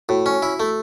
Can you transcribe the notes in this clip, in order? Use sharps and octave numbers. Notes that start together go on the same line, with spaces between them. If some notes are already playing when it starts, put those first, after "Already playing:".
A2 F#4
C#4
E4
A3